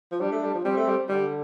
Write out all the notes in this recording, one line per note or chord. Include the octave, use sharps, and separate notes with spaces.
F3
G3 D4
A3
G3
F3
G3 C4
A3
G3
D3 G3